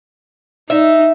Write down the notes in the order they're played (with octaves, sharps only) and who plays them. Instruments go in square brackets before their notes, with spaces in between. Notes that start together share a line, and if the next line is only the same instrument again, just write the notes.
[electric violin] D#4 [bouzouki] E5